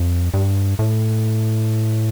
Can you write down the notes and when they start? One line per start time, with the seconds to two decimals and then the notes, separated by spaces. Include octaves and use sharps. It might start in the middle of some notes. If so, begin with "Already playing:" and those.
Already playing: F2
0.34 G2
0.79 A2